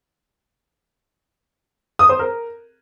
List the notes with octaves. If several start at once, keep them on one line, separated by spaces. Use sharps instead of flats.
D#6
C5
A#4